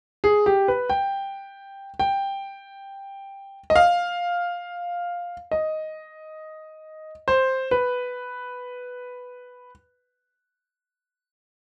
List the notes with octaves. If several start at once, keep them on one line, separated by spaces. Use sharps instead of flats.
G#4
G4
B4
G5
G5
D#5
F5
D#5
C5
B4